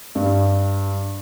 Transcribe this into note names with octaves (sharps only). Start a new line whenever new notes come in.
G2